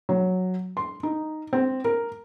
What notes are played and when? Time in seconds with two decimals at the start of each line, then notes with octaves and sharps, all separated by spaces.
0.09 F#3
0.77 C6
1.03 D#4
1.53 C4
1.85 A#4